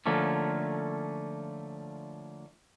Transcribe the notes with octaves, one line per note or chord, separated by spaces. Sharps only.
D3 F3 A3 A#3 C#4